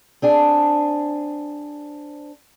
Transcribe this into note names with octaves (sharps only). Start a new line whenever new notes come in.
C4 D4 G#4